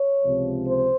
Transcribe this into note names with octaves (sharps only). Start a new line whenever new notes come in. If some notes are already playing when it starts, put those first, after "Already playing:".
Already playing: C#5
C#2 C3 F3
C5